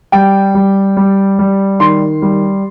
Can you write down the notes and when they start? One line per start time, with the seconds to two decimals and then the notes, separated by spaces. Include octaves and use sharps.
0.12 G3 G5
0.55 G3
0.97 G3
1.39 G3
1.80 D#3 C6
2.22 G3